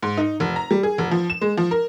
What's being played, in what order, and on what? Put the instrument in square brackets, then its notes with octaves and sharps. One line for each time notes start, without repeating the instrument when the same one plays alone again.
[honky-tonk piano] G#2
D#4
F1
A#5
G3
G#4
F1
F3
E7
G#3
F3
A#4